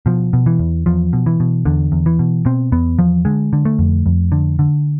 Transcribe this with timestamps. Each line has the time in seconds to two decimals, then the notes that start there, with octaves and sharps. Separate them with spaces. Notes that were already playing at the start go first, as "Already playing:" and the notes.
0.06 B2 F3
0.33 B2
0.46 E3
0.59 E2
0.86 E2 F3
1.13 B2
1.26 E3
1.40 B2
1.65 E2 D3
1.92 E2
2.06 E3
2.19 B2
2.45 B2 C4
2.72 E2 B3
2.99 E2 F3
3.25 D3 G#3
3.53 D3
3.65 A3
3.79 F2
4.06 F2
4.32 D3
4.59 D3